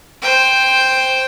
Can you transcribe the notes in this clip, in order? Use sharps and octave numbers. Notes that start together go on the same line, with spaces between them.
C5 G5